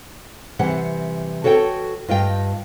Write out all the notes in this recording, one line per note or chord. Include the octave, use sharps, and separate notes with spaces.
C3 E3 G3 F#5
F#4 A4 C#5 F5 G5
G2 F4 D#5 G5